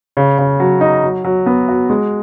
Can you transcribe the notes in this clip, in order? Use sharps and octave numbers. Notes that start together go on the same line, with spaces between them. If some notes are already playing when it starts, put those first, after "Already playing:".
C#3
C#3
F#3
D#4
F#3
F#3
B3
F#4
G#3